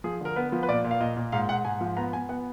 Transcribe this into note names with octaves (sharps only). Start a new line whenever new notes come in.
F3 G#4
D3 A#4
B3 B4
F3
B4
A#2 D5
A#2
F5
A#2 D#5
A#2
G#2 F5
G#2 F#5
G#2 G#5
F3
B3 A#5
B3 G#5
B3 F#5